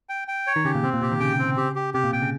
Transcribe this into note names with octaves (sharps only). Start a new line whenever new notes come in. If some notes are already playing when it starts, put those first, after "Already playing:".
G5
G5
C#5
D#3
C#3 G4
A#2
C3 C4
A#2
C3 G4
D#3
C#3 G5
C4
G4
G4
C3 G4
A#2
C3 G5
C#3